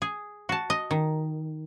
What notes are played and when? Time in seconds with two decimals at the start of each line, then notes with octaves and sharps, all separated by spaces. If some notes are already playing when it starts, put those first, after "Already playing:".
0.02 G#4
0.49 F#4 A5
0.70 D#5
0.91 D#3